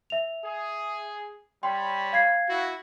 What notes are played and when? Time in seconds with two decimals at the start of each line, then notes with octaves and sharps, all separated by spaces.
0.10 E5 F7
0.44 G#4
1.63 G3 C#5 G5 B5 C6
2.13 F5 G#6 C7
2.48 E4 F#4